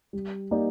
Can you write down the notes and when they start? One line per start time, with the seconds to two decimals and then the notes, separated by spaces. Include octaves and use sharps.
0.13 G3
0.51 A#3 D#4 G4 D5